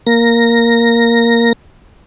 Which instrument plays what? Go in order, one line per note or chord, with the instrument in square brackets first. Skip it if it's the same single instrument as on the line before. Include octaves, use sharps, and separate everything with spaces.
[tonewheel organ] A#3 A#6